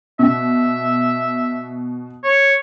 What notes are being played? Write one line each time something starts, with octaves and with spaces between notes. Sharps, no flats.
B2 E5
C#5